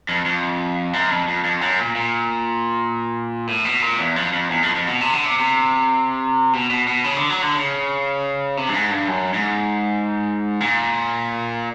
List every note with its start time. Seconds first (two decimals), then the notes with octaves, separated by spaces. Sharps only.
0.09 F2
0.26 F2
0.93 F#2
1.10 F2
1.28 F2
1.45 F2
1.61 F#2
1.78 A#2
1.96 A#2
3.47 A2
3.65 B2
3.82 A#2
3.99 E2
4.16 F2
4.33 F2
4.50 E2
4.63 F2
4.75 F2
4.88 B2
5.01 C3
5.14 D3
5.26 C3
5.39 C3
6.53 B2
6.70 B2
6.87 B2
7.04 C#3
7.17 D3
7.29 F#3
7.42 D3
7.55 C#3
8.57 C3
8.68 G2
8.74 G#2
8.91 G2
9.08 F#2
9.34 G#2
10.60 A#2